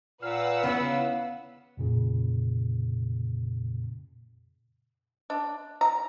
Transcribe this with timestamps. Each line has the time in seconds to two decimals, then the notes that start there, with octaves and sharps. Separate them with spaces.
0.22 A#2 B4 F5 F#5 E6
0.63 C#3 B3 E4
1.77 F2 A#2 C#3
5.30 D4
5.81 A#5